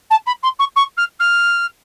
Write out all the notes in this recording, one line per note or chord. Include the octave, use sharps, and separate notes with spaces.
A5
B5
C6
C#6
C#6
F6
F6